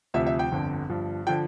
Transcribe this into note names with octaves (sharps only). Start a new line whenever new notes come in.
D2 C3 F3 E5
E5
G5
G1 F2 D3
G1 G2 F3
D3 F3 G5